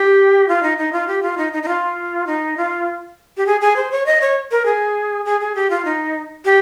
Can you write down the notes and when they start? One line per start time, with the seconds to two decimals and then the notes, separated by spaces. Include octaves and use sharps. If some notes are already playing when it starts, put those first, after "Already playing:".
Already playing: G4
0.48 F4
0.63 D#4
0.78 D#4
0.93 F4
1.08 G4
1.23 F4
1.38 D#4
1.53 D#4
1.63 D#4
1.68 F4
2.27 D#4
2.57 F4
3.37 G4
3.46 G#4
3.61 G#4
3.76 C5
3.92 C#5
4.06 D#5
4.21 C#5
4.51 A#4
4.65 G#4
5.25 G#4
5.41 G#4
5.55 G4
5.70 F4
5.85 D#4
6.45 G4